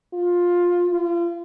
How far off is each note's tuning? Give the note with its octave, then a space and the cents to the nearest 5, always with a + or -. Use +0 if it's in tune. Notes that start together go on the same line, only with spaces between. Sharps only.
F4 +15
F4 -35